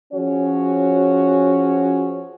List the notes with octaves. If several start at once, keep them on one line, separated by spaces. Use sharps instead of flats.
F3 C#4 F#4 G#4 C#5